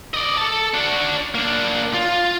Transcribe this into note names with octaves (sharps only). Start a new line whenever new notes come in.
D5 D#5
A4 A5
D4 F#4
A#3 D4
F4